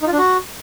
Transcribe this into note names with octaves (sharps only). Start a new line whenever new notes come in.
D#4
F4
D4
F#4